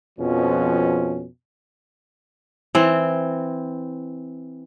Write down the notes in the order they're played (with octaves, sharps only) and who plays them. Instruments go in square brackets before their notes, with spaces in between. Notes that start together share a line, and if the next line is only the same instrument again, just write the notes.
[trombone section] F2 B2 F3 C#4
[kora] E3 C4